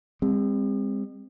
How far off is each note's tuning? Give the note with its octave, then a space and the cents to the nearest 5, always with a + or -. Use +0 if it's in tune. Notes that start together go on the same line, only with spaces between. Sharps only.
G#3 -45 C4 +0